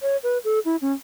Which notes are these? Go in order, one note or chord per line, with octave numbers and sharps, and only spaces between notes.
C#5
B4
A4
E4
C#4